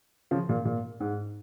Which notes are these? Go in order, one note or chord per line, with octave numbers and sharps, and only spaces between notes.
C#3 F3
A#2
A#2
G#2